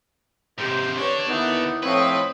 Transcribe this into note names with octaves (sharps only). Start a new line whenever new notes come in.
G#2 C3 G4 C5
D3 D4 B4 C#5
D#2 B3 D#4 E4
A2 F3 C4 B4 C#5 D#5